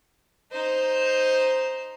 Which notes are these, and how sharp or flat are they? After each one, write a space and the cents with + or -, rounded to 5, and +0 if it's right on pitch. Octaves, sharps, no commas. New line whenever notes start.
D#4 +0 C5 +0